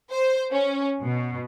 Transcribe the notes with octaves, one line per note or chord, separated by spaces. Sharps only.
C5
C#4
B2